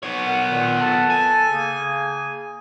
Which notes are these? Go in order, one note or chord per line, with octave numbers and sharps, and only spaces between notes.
B3 C#5
A#4 F#5
A#2 D#3
A4 A5
G#5
C#3 A#3 G#4